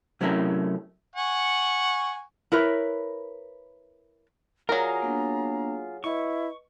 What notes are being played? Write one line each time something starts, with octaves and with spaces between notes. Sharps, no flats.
C3 F#3 A3 C#4 E4 A#4
F#5 G#5 C#6
E4 A#4 B4 C#5
F#3 F4 G#4 A#4 D5 F5 A#5
A#3 B3 D4
E4 B4 D#5 C#6